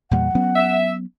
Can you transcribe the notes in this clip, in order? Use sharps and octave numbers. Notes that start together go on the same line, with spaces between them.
E2 A#2 G3 F#5
F#3 B3 C#4
E5